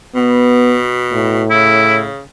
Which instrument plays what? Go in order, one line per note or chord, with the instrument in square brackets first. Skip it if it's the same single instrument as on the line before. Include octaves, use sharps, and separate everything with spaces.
[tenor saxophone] B2 [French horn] B3
[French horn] A2
[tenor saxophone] C#3 [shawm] E4